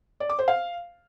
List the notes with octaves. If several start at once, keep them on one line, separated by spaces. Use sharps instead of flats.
D5
D6
C5
F5